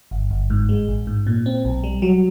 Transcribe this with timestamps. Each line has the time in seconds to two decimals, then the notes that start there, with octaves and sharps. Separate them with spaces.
0.11 G1
0.31 G1
0.50 G#2
0.69 G#3
0.88 A1
1.07 G#2
1.27 A#2
1.46 C4
1.65 B1
1.84 G3
2.02 F#3